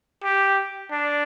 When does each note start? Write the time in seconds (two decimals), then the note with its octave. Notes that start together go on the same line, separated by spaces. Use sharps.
0.23 G4
0.92 D4